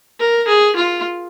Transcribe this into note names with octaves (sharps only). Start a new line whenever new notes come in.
A#4
G#4
F4